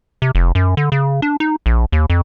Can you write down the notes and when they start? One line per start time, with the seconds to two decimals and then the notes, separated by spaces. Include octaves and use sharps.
0.22 C3
0.35 F1
0.55 F#2
0.77 D3
0.92 C#3
1.22 D4
1.40 D#4
1.66 A#1
1.92 D#2
2.10 F2